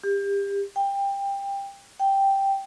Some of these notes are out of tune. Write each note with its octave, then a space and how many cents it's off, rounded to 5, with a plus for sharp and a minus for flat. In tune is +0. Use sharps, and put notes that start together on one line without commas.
G4 +30
G5 +20
G5 +0